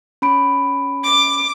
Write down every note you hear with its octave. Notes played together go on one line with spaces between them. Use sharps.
C#4 B5 D7
D6